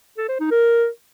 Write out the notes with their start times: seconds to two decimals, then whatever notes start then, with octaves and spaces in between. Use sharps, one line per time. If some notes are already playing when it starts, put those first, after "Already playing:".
0.17 A4
0.29 C5
0.40 D#4
0.51 A#4